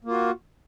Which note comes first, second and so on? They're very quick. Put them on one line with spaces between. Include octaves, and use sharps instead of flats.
A#3 F4 F#4